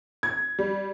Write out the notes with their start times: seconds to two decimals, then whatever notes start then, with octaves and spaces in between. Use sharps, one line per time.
0.23 G#6
0.59 G3